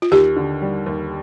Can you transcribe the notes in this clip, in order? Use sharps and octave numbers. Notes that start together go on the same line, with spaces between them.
F4
D#2 G4
D3
G3
D#2